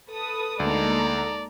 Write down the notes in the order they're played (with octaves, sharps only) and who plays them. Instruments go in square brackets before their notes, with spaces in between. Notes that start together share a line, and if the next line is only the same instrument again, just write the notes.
[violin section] A4 B4 D#6
[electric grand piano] D2 [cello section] G#3 A#3 D#4 [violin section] A4 A#5 [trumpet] D5